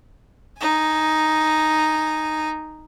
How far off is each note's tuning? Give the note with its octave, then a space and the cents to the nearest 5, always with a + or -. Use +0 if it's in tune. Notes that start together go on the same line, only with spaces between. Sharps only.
D#4 +0 G#5 +0